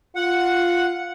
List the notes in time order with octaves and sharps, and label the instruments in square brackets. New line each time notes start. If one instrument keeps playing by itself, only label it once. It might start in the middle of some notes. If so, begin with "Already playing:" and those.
[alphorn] F4 [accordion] F#5